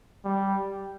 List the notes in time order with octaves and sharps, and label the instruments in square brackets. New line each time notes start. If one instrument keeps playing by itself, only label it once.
[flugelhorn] G3